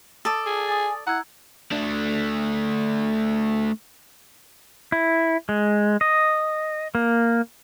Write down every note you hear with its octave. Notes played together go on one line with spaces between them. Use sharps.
A4 D5 A5 D#6
G#4
G#5 D#6 A6
E4 F#5 A#5 E6 G#6
A3 D4
E4
G#3
D#5
A#3